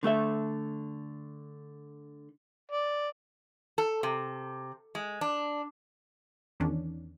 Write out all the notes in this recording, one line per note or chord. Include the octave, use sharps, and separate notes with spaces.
D3 A3 A4 E5
D5
A4
C3
G#3
D4
E2 D#3 C#4 D4